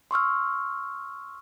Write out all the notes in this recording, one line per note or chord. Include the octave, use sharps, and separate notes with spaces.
C6 C#6 E6 F6